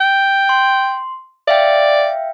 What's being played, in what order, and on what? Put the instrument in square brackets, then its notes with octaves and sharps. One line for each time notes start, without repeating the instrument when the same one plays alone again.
[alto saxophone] G5
[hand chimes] C6
[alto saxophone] D5 [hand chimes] E5 F5 G5